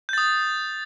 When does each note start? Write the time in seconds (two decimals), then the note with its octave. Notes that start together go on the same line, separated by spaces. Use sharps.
0.09 G6
0.13 A6
0.18 D#6